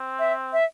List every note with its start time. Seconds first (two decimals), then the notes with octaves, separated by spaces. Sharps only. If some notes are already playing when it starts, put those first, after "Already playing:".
Already playing: C4
0.19 E5
0.53 E5